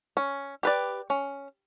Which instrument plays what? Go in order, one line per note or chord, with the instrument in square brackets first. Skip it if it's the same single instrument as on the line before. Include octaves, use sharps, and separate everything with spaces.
[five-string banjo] C#4
G4 B4 D5
C#4